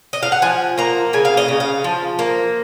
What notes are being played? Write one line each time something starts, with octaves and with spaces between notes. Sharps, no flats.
D#5
F5
F#5
F3 G#5
A#3 A#5
C#3 G#5
F5
D#5
C#3
F5
F3
A#3